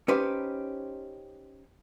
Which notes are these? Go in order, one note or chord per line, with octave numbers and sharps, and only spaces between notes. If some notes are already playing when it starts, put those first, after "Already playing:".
C#4 D#4 G4 B4 C5